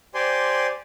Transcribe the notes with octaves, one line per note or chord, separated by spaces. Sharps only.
G4 C5 D5 G#5 C6